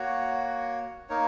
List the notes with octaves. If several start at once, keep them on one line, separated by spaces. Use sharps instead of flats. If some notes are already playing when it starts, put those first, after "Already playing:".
Already playing: A#3 F#4 C#5 F#5
A#3 D#4 A#4 C#5